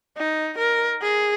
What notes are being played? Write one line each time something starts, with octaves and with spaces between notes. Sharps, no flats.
D#4
A#4
G#4